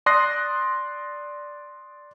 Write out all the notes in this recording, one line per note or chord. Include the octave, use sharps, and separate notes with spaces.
D5 C6 D#6 F#6 A#6 C7